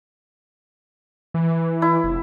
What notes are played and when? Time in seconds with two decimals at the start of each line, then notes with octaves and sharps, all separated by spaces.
1.34 E3
1.82 E4
2.04 F1